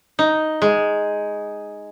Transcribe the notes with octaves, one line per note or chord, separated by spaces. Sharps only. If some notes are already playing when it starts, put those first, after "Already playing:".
D#4
G#3